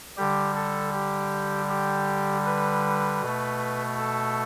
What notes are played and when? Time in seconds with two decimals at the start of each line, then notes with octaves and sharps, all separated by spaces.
0.17 D3 G3 G4
0.56 A4
0.93 G4
1.69 G4
2.46 B4
3.21 B2 A3
3.98 A4